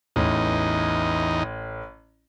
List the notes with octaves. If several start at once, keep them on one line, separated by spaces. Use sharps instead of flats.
A1 E2 D#4